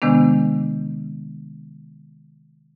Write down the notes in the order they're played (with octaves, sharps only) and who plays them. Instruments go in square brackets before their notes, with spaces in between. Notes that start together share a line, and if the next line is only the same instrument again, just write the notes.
[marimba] C3 D#3 G#3 B3 D4